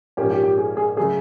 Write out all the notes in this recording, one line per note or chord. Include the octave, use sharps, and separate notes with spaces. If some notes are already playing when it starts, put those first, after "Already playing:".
A#1 G#2 F3 A#3 C#4 G4
G4
G4
G#4
G#4
C#3 F#3 A3 G#4